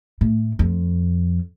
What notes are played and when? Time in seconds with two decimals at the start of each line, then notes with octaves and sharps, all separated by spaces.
0.21 A2
0.59 F2